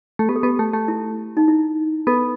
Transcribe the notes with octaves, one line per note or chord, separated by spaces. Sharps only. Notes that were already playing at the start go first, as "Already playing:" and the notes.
A3
B3 G4
A4
B3 G4
A3
A3
E4
D#4
E4
B3 A4